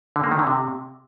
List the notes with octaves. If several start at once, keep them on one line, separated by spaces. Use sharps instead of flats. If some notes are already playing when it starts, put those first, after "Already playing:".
D3
A#3
D#3
D3
C3